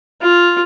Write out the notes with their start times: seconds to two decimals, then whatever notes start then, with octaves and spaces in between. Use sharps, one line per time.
0.22 F4